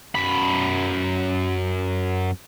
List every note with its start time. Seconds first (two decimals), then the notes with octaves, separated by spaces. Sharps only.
0.15 F#2 B5